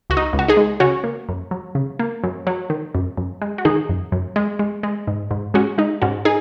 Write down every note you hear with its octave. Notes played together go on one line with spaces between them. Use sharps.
C#2 F#4
D#4
C#2
F#4
D#4 G#4
G#3
C#3 C#4 F#4
A#3
F#2
F#3
C#3
A#3
F#2
F#3
D#3
F#2
F#2
G#3
F#4
D#3 D#4 G#4
F#2
F#2
G#3
G#3
G#3
G#2
G#2
G#3 C#4 F#4
G#3 D#4
G#2 C#4 F#4
D#4 G#4